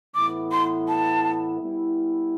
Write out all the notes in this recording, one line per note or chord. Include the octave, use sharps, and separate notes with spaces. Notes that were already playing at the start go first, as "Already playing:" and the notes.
A2 E3 B3 E4 D6
C6
A5
G3 B3 E4